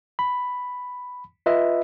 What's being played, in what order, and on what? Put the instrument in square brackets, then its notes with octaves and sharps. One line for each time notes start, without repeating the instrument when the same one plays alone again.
[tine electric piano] B5
F4 B4 D#5 E5